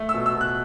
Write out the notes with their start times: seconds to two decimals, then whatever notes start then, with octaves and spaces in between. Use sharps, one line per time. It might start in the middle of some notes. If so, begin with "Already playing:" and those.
Already playing: A3
0.09 E6
0.14 B2
0.26 E6
0.35 B2
0.41 F#6